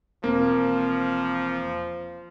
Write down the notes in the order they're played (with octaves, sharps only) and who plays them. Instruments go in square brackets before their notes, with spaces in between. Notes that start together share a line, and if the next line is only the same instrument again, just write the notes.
[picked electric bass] E1 C4 [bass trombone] F3 [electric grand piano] A#3